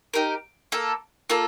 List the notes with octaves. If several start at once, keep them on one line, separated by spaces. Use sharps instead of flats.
D#4 G4 A#4
A#3 F4 A4
A#3 F4 A4